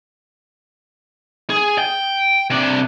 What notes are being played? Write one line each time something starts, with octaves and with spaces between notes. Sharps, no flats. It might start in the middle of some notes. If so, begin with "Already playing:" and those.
G#4
G5
C3 D4